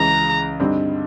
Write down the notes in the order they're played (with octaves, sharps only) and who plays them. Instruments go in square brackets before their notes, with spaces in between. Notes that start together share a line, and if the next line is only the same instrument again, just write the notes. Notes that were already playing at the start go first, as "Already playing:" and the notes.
Already playing: [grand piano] C#2 C#3 E3 [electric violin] A#5
[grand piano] G2 D3 G3 C4 D#4